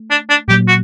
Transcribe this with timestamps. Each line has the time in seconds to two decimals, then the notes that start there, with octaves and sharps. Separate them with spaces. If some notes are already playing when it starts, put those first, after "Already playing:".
Already playing: A3
0.10 D4
0.29 D4
0.48 A#2 F#3 A#3 G4
0.68 F#4